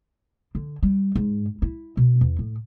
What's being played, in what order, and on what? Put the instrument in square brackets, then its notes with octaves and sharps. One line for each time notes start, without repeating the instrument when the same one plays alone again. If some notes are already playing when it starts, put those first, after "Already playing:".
[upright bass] D3
G3
G#2
E4
B2
E2
A2